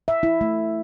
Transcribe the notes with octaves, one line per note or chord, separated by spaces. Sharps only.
E5
E4
A3